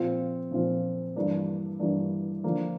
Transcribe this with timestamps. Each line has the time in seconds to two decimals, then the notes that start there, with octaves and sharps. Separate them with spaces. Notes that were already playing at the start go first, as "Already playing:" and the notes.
Already playing: A#2 F3 C4 F4
0.51 A#2 F3 C4 F4
1.16 G2 E3 A#3 D4
1.79 G2 E3 A#3 D4
2.43 D3 F3 A#3 D4